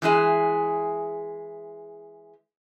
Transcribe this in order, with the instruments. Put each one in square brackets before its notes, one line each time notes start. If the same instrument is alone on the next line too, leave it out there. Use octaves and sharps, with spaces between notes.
[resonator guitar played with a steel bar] E3 G#3 E4 G#4